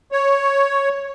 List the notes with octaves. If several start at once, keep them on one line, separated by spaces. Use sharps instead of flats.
C#5